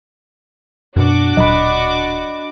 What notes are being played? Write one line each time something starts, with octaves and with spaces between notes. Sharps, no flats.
F#2 B2 D4 F#4 D6
D1 A#2 F#3 D#5 B5